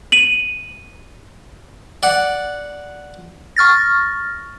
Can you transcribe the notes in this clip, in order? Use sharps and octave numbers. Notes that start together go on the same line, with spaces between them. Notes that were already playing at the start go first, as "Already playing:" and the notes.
D#7 F#7
D5 F#5
C#6 F6 A6 A#6